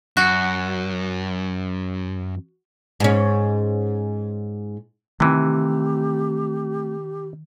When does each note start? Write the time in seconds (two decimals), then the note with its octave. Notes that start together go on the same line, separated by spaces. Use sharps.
0.17 F#2 F#4
3.00 G#2 C#4
5.20 C3 D#3 E3 A3 C4 G4